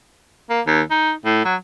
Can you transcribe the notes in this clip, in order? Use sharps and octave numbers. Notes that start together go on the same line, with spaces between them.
A#3
D#2
D#4
A2
F#3